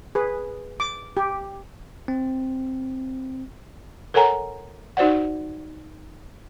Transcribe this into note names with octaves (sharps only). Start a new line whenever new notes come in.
G#4 B4
D6
G4
C4
A4 A#4 C#5 F#5 G#5 A#5
D#4 F#4 C5 D5 F#5